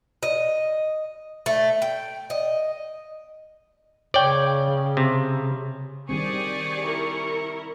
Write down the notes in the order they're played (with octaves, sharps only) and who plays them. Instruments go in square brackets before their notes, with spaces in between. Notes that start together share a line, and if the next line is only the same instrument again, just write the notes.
[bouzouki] D#5
A3
G5
D#5
[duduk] C#3 [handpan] C#5 [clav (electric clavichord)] D5 G5
[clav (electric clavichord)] C3
[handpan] D#3 G3 C4 [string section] G4 G#4 D5 [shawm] C#6
[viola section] E4 A#4